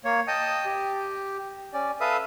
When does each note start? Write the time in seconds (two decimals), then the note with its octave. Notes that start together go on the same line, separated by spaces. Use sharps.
0.05 A#3 C#5
0.28 D#5 G5 A5 D#6
0.65 G4
1.73 C#4 D5
2.00 A4 B4 E5 F5 D#6